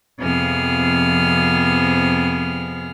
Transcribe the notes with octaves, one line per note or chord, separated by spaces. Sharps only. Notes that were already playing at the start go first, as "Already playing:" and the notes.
F2 C3 F3 B3 G#4 F6